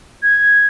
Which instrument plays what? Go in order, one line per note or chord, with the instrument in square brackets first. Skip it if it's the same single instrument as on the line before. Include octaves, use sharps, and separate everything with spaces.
[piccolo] G#6